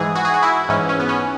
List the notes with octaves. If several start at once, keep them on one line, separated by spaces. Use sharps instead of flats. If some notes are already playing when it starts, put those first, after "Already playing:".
Already playing: G#2 E3 G#4
F#4
G#4
F#4
E4
G#2 E3 C#4
C#4
B3
C#4